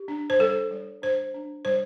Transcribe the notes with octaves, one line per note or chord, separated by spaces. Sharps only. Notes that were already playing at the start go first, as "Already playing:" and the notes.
Already playing: G4
D4
C5
G3 A4
G3
D4 C5
D4
G3 C5